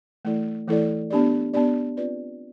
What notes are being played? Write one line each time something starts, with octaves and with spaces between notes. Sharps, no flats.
E3 A3 E4 A4 D5
E3 A3 E4 A4 D5
B3 D4 G4 D5
B3 D4 G4 D5
C4 F4 B4 D5